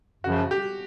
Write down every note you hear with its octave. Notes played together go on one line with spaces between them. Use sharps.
F#2 C#3 F3 F#4
G4